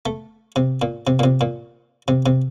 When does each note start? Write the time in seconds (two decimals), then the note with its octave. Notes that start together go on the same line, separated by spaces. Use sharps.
0.06 A3
0.56 C3
0.82 A#2
1.07 C3
1.19 A#2
1.23 C3
1.41 A#2
2.08 C3
2.26 C3